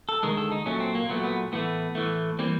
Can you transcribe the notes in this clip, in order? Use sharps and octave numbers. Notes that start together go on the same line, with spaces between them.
A4
D2 C3 D#3 G#3 A#4
A4
D#4
A#2 F#3 A3 C#4
C4
A#3
A#2 F#3 A3 B3
B3
A2 E3 A3 B3
A2 E3 A3
E3 G3 A#3 C4